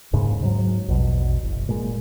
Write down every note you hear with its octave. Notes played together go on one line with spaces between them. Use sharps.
D1 D#2 G#2 C#3
G#2 F3 F#3
A#1 E2 B2
F#1
A#2 G#3